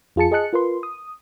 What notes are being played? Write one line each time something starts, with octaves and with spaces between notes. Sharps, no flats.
F2 F4 G#4 A5 C#7
G#4 D#5 A5 F#6 C#7
F4 A#4 B4 C6
D#6